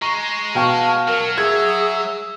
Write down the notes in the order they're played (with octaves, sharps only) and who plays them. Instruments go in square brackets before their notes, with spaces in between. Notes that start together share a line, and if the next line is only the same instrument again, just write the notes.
[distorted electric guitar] G#3 [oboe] A#5 [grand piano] C#6
[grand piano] B2 G5 C#6 [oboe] F5 [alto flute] A5
[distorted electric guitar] F#3 [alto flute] A#4
[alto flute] G#4 [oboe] E5 [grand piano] G#6